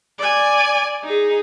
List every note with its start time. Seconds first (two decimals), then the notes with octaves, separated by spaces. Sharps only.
0.19 D5 G#5
1.04 D#4 G#4